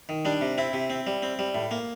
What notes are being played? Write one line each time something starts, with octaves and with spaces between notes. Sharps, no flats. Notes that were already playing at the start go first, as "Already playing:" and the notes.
D#3
G3 D4
C3
C4 E4
C3
C4
G3
C4
G3
A2
A#3